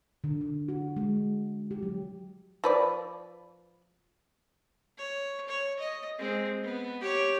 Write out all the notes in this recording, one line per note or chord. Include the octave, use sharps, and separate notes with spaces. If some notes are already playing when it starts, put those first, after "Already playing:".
D3
D3
F#4
G#3
G4
F#3
F3 B4 D5
C#5
C#5
D#5
G#3 C4
B3
G4 C#5